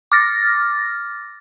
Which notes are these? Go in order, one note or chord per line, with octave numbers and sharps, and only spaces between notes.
D6 F6 A6 A#6